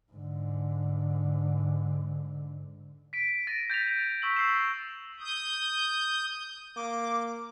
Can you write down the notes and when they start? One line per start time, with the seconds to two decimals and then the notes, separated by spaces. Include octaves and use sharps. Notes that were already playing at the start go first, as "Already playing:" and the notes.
0.12 G#2 D3
3.13 B6 D7
3.47 A6 A#6 D7 D#7
3.70 G6 A6 B6 F7
4.22 C#6 E6 B6 F#7
4.36 E6 C7 E7
5.20 D#6 G6
6.77 A#3 D6